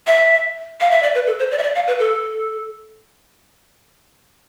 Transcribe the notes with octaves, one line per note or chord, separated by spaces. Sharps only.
E5
F5
E5
D5
B4
A4
C5
D5
E5
D5
F5
B4
A4